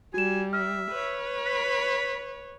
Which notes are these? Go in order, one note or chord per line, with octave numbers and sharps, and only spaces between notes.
G3 F#4 G#5 E7
E5 F6
B4 C#5
B5